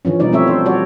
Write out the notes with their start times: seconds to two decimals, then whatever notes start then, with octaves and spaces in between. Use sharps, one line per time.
0.05 D3 E3 F3 C#4
0.20 B2 F3 G3 D#4 D5
0.32 F3 A3 C4 E4 C#5 E5
0.47 D4 C5
0.65 G3 F#4 C#5 D5